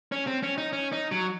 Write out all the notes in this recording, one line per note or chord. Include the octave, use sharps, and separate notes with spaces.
C#4
C4
C#4
D#4
C#4
D#4
F#3